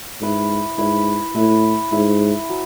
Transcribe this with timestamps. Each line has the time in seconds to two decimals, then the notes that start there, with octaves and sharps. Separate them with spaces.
0.21 G#2 E4 B4 E5
0.78 G#2 E4 B4 E5
1.35 A2 E4 B4 E5
1.92 G#2 E4 B4 E5
2.49 F#3